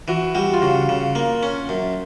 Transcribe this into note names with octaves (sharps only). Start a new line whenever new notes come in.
E3 F#4
G3 F#4
F4
C#3 F#4
C#3
A#3
C#4
F#2